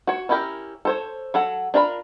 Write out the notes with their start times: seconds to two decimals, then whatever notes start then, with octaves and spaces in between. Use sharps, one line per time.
0.07 F#4 C#5
0.29 C#4 E4 F4 G4 A#4
0.85 A4 C5 C#5
1.34 F#3 A4 F#5
1.74 D4 F4 A#4 A#5 B5